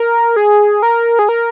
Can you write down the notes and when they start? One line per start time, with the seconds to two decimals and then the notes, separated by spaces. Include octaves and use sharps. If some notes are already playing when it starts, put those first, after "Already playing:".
Already playing: A#4
0.36 G#4
0.82 A#4
1.19 G#4
1.29 A#4